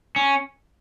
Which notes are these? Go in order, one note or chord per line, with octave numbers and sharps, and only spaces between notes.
C#4